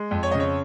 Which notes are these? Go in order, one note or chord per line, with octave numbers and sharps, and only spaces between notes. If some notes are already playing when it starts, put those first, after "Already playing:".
Already playing: G#3
F2
C#5
C#3 D#5
C#5